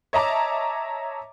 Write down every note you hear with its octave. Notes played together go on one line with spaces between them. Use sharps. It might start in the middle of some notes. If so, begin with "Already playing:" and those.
C#5 D#5 E5 A5 A#5 D6